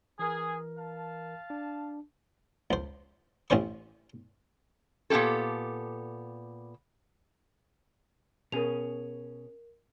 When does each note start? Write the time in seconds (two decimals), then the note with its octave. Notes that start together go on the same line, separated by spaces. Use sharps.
0.19 E3 G#4 A#4
0.79 F5 A5
1.50 D4
2.71 C#2 C5
3.50 A1 C4 C#4 C5 C#6
5.10 A#2 B3 E4 G4 A4
8.52 B2 C#4 G#4 A#4 F7